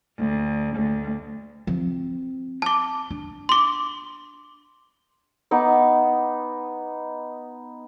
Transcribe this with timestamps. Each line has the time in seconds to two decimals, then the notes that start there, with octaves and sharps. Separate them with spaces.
0.18 D2
0.76 D2
1.67 F3 C4
2.62 A5 D6
3.11 D4
3.49 C6 D6
5.51 B3 D#4 D6